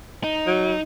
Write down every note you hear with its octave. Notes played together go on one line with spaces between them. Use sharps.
D#4
F#3